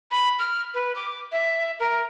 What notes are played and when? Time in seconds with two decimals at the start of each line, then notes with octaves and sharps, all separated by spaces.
0.11 B5
0.39 F6
0.74 B4
0.95 D6
1.32 E5
1.80 A#4